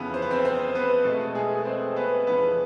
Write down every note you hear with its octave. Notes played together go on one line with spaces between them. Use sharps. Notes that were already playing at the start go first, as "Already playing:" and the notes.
Already playing: F2 C#3 E3 B3 B4
C5
B4
C4 C5
C4 C5
B3 B4
B2 G#3 A3 C4 A4
G#3 G#4
C4 C5
B3 B4
F2 C#3 E3 B3 B4